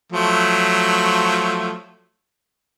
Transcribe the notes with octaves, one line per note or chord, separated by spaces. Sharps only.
F3 F#3 A3